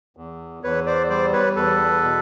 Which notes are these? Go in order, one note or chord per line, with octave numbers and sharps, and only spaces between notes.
E2
E2 B4 C#5
C5 D5
G3 C5 D5
B4 C#5
E2 A4 B4
B2